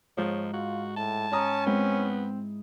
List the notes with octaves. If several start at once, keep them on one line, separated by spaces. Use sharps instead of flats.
G#2 F3 C#5
F4 F#4
A2 A5
C#4 A#5 D#6
G#3 B3 C4 E4